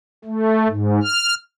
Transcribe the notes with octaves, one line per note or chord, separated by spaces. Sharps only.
A3
G#2
F6